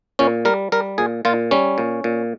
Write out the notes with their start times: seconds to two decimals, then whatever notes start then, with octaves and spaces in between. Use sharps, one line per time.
0.19 A#2 C#4
0.45 G3 A#4
0.72 G3 A#4
0.98 A#2 G#4
1.25 A#2 F4
1.51 G3 C#4
1.78 A#2
2.04 A#2